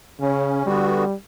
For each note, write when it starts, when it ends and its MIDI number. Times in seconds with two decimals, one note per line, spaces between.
0.21 0.64 49
0.21 0.66 61
0.66 1.04 50
0.66 1.13 55
0.66 1.04 59
0.66 1.04 66